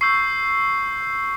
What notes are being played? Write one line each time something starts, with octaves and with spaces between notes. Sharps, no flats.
C#6 E6 G6 C7